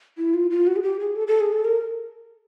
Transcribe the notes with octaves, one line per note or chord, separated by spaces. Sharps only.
E4
F4
F4
F#4
G#4
G4
G#4
A4
A4
G#4
A4
A#4